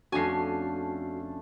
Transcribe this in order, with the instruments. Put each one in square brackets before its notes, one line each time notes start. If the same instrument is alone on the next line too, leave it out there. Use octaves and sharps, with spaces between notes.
[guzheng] F2 G#5 [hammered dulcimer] A3 C#4 D4 [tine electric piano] F#4 C7